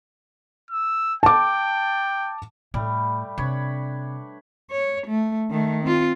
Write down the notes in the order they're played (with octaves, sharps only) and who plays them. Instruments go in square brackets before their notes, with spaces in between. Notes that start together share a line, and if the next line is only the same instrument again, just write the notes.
[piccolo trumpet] E6
[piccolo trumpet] G5 [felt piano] A5 D6
[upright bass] A2 [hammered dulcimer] G3 A3
[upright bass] C3 [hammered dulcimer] D4 B4 C#5
[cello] C#5
A3
D#3 A3
C4 F4